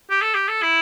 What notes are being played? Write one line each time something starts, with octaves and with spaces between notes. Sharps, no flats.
G4
A4
G4
A4
E4